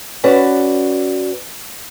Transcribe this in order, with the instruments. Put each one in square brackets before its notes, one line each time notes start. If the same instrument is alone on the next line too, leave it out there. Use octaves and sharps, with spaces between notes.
[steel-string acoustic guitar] C#4 F#4 B4 D5